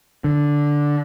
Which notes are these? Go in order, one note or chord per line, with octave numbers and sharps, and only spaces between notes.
D3